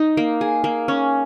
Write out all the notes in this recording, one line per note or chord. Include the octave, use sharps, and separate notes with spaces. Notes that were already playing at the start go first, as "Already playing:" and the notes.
Already playing: D#4
A#3
G#4
A#3
C#4